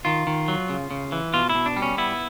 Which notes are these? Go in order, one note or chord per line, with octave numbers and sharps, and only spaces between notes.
D#3 F4
D#3
F#3
C#3
C#3
E3
B2 F4
E4
B2
D4
G3
C#4
B3 E4